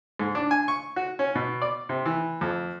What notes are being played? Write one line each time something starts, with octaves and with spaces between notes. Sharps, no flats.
G#2
D4
G#5
C#6
F#4
C#4
B2
D5
C3
E3
F2